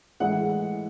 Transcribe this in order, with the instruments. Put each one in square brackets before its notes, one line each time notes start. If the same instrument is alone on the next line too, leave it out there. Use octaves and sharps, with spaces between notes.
[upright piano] A2 E3 G#3 F#5